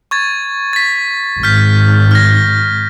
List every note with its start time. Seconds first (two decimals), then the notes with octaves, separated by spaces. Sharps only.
0.11 C#6 G#6 A6
0.73 A6 B6
1.43 G#1 F6 G6 B6
2.11 F6 A#6